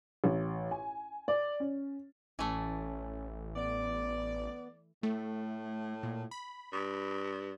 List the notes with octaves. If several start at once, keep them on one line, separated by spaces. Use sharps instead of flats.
A1
G#5
D5
C#4
A1 E3 A3 C#4
B3 D5
A2 A3
A#2
B5
G2